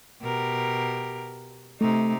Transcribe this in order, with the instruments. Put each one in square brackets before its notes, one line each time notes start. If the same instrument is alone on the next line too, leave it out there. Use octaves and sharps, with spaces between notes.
[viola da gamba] B2 G4 A#4
[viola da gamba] C3 D#4 [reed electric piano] A3